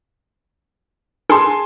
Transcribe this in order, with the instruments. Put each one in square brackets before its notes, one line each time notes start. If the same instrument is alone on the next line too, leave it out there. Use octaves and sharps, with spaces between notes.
[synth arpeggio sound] D4 G#4 [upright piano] G#5 A5 C6